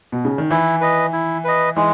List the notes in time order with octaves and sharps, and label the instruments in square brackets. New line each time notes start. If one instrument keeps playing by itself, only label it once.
[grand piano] B2
C#3
D#3
[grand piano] E3 [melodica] E4
[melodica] B4 D#5
E4
B4 D#5
[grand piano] E3 [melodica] G#3